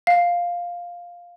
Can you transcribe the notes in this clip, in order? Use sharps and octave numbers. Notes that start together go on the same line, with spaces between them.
F5